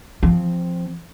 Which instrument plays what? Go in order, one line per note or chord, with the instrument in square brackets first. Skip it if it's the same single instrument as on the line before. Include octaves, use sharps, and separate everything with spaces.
[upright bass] F3 C4